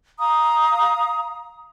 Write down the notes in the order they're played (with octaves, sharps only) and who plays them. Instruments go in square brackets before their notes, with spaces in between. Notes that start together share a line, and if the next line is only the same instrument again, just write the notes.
[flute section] F5 A#5 D#6